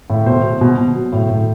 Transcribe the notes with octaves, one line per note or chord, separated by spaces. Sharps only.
A2
B2 C5
B2
B2
B2
F#3
A2
A2